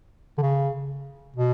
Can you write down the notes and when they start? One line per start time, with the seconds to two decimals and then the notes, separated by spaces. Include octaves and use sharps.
0.38 D3
0.42 C#3
1.37 B2